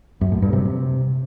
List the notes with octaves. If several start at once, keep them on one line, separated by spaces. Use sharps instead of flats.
F#2
A2
G2
C3